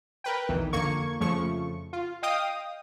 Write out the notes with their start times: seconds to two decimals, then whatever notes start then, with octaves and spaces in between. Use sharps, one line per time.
0.24 A#4 B4 G5
0.49 B1 E2 D#3 E3
0.73 F2 D3 A#3 C#6 G#6
1.20 F2 C#3 F3 A3 C#6
1.93 F4
2.23 D#5 F5 G5 D#6